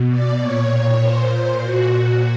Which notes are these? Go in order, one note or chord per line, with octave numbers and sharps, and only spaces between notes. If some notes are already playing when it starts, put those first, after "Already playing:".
Already playing: B2
D5
A#2 C#5
A#2 C5
A#2 F#4